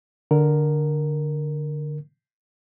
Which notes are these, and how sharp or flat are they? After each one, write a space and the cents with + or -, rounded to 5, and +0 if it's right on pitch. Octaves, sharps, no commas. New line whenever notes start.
D3 +10 A#4 +0